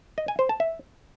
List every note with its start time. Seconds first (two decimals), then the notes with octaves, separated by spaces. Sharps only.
0.18 D#5
0.28 G#5
0.39 C5
0.49 A5
0.60 E5